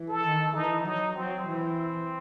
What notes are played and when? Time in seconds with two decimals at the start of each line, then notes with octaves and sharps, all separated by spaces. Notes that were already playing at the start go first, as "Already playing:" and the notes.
Already playing: E3
0.08 A4
0.24 D#3
0.55 E3 D#4
0.85 F#3 D#4
1.16 F#3 C4
1.46 E3 C4